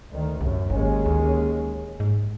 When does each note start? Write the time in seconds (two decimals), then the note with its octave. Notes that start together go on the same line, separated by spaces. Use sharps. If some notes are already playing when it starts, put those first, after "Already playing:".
0.10 D2 D#3
0.41 C2 F#2 A2
0.70 G#1 D#2 G#3 C#4
1.06 D2
2.00 G#2